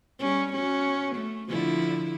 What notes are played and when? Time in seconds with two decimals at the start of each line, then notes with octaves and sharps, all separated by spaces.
0.19 G3 C#4
0.53 C#4 F#4
1.16 A3
1.49 D3 F3 E4